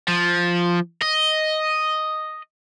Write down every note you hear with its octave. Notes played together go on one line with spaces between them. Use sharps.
F3
D#5